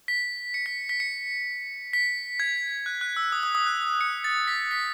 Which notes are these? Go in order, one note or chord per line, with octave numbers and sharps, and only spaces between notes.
B6
C#7
B6
B6
C#7
B6
G#6
F#6
F#6
E6
D#6
D#6
D#6
F#6
C#7
A6
B6
B6